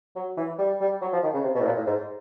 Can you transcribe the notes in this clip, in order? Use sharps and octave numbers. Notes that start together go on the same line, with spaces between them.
F#3
E3
G3
G3
F#3
F3
D#3
C#3
C3
B2
A2
A#2
A2
G#2